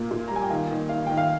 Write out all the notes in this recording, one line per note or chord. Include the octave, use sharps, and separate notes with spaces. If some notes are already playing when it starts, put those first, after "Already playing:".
Already playing: A#2 A#3
A#2
A#5
G3
G#5
G5
D#3 F5
D#3
D#3 F5
D#3 G5
F5